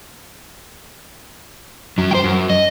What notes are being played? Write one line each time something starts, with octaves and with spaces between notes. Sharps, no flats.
F#2 F#3
C5 G5
F#2
D#5